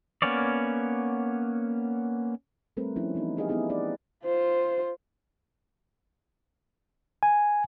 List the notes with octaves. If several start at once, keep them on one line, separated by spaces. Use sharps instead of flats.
A#3 B3 C#4 C#5 D5
G3 A3 C4 A#4 B4
F3 B3 C#4 D4 E4
E3 B3 D#4
D#4 G4 G#4 B4 D#5 F5
B3 D#4 E4 G#4
D#4 G#4 B4 D5
F4 C5
G#5